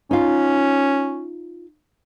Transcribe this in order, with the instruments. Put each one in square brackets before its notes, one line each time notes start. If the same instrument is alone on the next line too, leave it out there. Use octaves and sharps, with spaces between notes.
[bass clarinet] C#4 [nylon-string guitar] D#4 F4